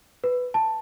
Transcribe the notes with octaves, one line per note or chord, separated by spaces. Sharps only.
B4
A5